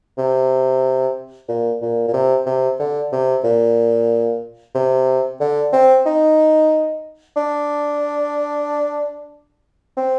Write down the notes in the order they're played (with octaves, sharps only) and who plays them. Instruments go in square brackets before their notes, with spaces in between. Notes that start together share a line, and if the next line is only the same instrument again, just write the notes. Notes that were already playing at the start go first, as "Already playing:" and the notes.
[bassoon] C3
A#2
A#2
A#2
C3
C3
D3
C3
A#2
C3
D3
C4
D#4
D4
C4